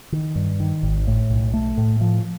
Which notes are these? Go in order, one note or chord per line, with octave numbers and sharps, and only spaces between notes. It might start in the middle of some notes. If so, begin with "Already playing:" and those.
D#3
G2
D#3
G#1
A2
B1
A3
A2
F3